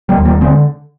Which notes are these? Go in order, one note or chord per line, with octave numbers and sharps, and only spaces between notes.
G3 A#3
D#2
G3 A#3
D3 G#3 C4